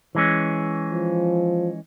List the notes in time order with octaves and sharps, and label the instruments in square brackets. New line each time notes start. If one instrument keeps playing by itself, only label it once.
[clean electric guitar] E3 G#3 C#4
[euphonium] F3